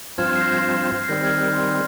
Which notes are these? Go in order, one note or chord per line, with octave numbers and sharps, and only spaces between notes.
G2 F3 C4 F4 C5 F6 G#6
F6 G#6
C7
G6 A#6
G#6 C7
C7
D#3 G3 C4 G6 A#6
F6 G#6
G6
C6